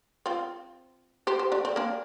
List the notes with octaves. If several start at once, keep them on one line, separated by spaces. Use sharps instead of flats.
C4 F4
G4 C5
G4 C5
D4 G4
C4
A#3 D4